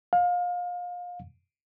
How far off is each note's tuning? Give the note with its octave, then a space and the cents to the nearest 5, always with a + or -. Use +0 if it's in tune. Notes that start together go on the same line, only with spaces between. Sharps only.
F5 +30